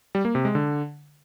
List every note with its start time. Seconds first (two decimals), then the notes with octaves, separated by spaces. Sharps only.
0.15 G3
0.25 A#3
0.35 C3
0.45 G#3
0.55 D3